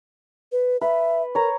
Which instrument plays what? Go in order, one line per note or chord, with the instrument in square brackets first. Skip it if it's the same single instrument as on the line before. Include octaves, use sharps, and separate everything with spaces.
[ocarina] B4
[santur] B4 [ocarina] E5
[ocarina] A#4 [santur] C#5 A#5